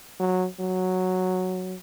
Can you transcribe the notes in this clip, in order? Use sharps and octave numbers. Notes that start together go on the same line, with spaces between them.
F#3
F#3